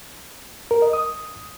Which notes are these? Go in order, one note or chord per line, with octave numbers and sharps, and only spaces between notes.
A#4
D#5
D#6